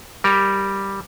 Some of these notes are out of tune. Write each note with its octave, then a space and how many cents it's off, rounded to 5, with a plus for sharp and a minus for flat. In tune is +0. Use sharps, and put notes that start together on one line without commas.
G3 +0 A#4 +0